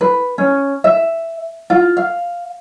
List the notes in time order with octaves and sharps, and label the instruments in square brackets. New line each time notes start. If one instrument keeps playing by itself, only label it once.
[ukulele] B4
C#4
E5
F4
F5